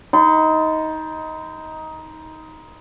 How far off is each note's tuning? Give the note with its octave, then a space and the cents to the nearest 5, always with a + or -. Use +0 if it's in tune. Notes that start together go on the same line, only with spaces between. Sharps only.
D#4 +15 A5 +0 C6 -35